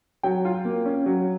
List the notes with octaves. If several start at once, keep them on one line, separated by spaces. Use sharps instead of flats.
F#3 G5
F4
A#3
C#4
F#3